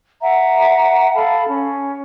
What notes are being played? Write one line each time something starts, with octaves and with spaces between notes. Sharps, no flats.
E5 F#5 A#5
A4 F5 A5 B5
C#4